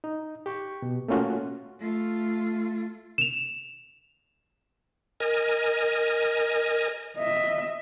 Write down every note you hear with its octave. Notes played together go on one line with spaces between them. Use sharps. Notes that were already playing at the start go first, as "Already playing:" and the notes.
D#4
G4 C#6
B2
A3 A#3 C#4 F4 F#4
A3 F4
E7 F7
A#4 D#5 G#5
D#5 E5